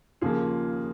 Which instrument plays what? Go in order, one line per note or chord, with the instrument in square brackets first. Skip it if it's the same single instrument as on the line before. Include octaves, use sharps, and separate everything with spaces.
[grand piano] D#2 C#3 F3 A#3 [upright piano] F4 G#4